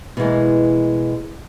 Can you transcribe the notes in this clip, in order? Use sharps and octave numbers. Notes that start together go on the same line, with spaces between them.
B2 E3 G#3 A#3